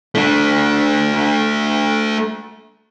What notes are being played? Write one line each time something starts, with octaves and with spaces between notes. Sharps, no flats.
A3 D4